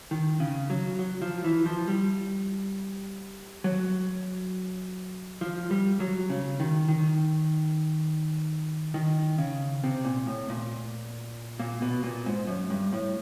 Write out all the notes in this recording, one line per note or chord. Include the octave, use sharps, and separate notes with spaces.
D#3
C#3
F#3
F#3
F3
E3
F3
G3
F#3
F3
G3
F#3
C#3
D#3
D#3
D#3
C#3
C3
A#2
A2
A#2
A#2
B2
A#2
G#2
F#2
G2
A2